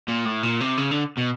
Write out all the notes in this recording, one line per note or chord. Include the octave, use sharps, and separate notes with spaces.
A#2
A2
A#2
C3
C#3
D3
B2